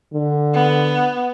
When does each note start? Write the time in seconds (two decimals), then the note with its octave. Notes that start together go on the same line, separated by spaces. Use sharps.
0.13 D3
0.53 B3